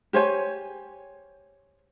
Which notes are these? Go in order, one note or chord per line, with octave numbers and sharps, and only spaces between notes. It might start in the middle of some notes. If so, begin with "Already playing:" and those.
G4 C5 C#5 G#5